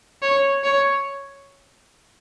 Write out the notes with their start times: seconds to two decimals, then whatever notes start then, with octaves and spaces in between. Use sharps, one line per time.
0.22 C#5
0.64 C#5